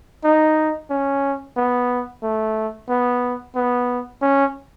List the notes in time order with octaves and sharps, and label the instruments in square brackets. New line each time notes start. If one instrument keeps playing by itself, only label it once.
[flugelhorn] D#4
C#4
B3
A3
B3
B3
C#4